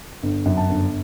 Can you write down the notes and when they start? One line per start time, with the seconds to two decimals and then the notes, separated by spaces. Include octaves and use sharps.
0.23 G1
0.46 F#2
0.57 A5
0.69 G1